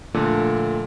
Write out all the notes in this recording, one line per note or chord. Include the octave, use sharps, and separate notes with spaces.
A#2 D3 F3 A3